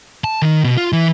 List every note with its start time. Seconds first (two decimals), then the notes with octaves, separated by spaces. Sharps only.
0.24 A5
0.42 D#3 D#4
0.64 B2
0.77 F4
0.93 E3